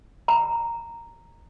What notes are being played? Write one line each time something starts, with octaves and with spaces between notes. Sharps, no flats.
A#5